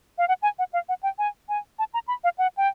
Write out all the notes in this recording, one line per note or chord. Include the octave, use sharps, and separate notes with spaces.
F5
F#5
G#5
F#5
F5
F#5
G5
G#5
G#5
A5
A#5
B5
F5
F#5
G5